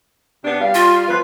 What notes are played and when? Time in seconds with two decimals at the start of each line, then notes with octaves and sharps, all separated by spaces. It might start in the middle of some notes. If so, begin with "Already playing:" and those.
0.43 C3 B3 D4
0.60 G3 F5
0.75 F4
1.09 F3 B4